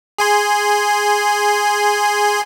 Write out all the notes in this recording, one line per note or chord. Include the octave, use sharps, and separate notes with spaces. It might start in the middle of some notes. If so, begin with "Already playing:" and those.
G#4 G#5 C6